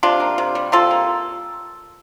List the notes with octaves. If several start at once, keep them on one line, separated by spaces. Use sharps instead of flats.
C3 D4 F4
A#3
C3
G3
C3 F4 A4
A#3